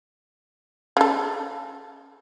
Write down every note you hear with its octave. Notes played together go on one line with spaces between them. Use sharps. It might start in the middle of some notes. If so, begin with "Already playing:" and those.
C#3 A4